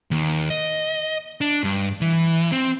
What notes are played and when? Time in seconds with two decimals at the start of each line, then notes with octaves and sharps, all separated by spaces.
0.11 D#2
0.50 D#5
1.41 D4
1.64 G2
2.01 E3
2.52 C4